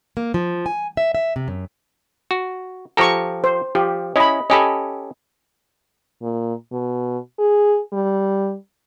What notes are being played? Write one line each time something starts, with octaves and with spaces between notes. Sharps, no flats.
A#3
F3
G#5
E5
E5
C3
F#2
F#4
F3 G4 A4 A#5 C#6
C5
F3 G4
C#4 E4 D#5 B5
C#4 G4 A4 D#5 G#5 B5
A#2
B2
G#4
G3